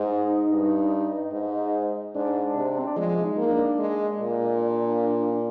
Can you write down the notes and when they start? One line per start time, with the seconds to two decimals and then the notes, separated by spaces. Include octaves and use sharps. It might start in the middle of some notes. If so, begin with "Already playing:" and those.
Already playing: G#2 D#4
0.50 G2
1.32 G#2
2.15 G#2 D4
2.42 D4
2.56 C3
2.70 D4
2.79 C4
2.87 D4
2.97 F3 G#3
3.24 D#4
3.38 A#3
3.46 D#4
3.51 D4
3.79 G#3
4.20 A#2